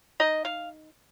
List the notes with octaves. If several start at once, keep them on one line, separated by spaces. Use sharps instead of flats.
D#4 D#5
F5